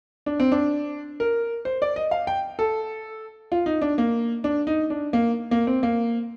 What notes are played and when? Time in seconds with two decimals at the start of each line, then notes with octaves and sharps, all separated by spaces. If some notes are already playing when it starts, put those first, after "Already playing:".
0.26 D4
0.40 C4
0.52 D4
1.20 A#4
1.65 C5
1.82 D5
1.96 D#5
2.11 F5
2.27 G5
2.59 A4
3.52 F4
3.66 D#4
3.82 D4
3.98 A#3
4.44 D4
4.67 D#4
4.90 D4
5.13 A#3
5.51 A#3
5.67 C4
5.83 A#3